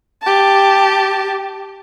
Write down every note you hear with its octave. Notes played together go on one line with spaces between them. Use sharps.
G4 A5